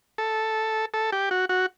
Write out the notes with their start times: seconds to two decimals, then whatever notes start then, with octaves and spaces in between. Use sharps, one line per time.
0.18 A4
0.94 A4
1.12 G4
1.31 F#4
1.49 F#4